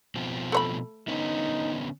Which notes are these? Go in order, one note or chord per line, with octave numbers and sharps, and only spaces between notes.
B2 F3 C4
A3 C#5 B5
D3 B3 C#4 D#4